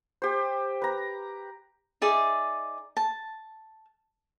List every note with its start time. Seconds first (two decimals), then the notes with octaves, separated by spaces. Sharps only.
0.22 G4 C5
0.82 B4 A#5
2.01 D#4 G#4 D5 E5
2.97 A5